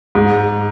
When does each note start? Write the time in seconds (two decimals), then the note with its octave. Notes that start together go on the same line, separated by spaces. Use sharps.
0.15 G#2